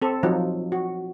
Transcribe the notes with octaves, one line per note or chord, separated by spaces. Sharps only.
C4 A4
F3 F#3 D#4 F4
F#4